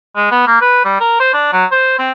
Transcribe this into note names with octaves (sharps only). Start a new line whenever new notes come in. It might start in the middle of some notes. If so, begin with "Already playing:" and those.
G#3
B3
A#3
B4
G3
A#4
C5
D4
F#3
C5
C4